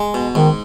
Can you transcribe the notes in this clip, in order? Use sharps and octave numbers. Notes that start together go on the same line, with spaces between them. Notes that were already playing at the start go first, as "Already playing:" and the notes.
Already playing: G#3
B2
G#2 D#3